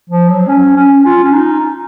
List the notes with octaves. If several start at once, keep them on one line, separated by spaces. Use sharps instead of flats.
F3
F#3
C#4
C#4
F4
C#4
D#4